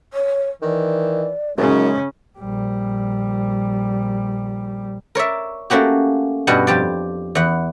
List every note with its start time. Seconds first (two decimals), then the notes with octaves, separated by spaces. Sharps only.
0.13 C#5
0.62 D#3 E3 D5
1.58 F#2 C#3 G#3 C#4 D#4
2.39 A#1 G3
5.15 A#4 C#5 D5 E5
5.70 A3 A#3 C#4 F#4 G4
6.47 G2 B2 G3 D#5 F#5
6.67 F2 G4 D5
7.35 E2 F#5